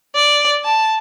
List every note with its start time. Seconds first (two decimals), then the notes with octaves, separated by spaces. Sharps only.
0.15 D5
0.64 A5